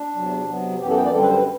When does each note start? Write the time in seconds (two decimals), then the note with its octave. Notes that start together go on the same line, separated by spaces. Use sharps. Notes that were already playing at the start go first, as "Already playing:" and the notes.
Already playing: D4
0.15 E2 C3 F#3
0.48 C3 F#3 B3
0.81 F#2 E3 B3 G4
0.90 A4
0.97 G5
1.05 D5
1.13 F#2 D3 G3 C4 A4
1.22 B4
1.29 C5
1.38 B4